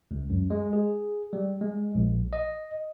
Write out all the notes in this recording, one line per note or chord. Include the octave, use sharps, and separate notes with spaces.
C#2
F#2
G#3
G#4
G3
G#3
A#1
D#5